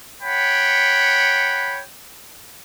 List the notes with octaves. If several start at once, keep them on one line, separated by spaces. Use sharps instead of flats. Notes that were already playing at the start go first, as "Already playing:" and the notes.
C#5 F#5 G5 B5